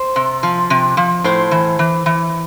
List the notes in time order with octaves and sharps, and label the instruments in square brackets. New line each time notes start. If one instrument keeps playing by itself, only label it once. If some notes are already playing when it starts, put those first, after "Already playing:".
Already playing: [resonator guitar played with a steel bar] C5
C3
F3
C3
F3
A2 C5
E3
E3
E3